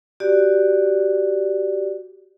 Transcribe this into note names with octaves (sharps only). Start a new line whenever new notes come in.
F#4 G4 D5